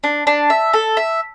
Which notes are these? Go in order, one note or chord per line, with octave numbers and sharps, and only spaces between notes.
D4
D4
E5
A4
E5